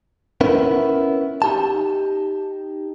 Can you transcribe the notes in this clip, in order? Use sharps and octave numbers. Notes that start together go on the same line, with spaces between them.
B3 C#4 E4 A#4
D#4 G4 A5